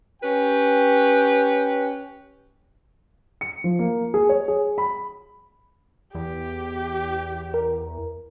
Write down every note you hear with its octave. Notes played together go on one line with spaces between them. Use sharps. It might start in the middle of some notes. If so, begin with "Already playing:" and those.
C#4 G4 B4 G5
C#7
F3
A#3
G#4
C#5
G#4
B5
E2 G4
A#4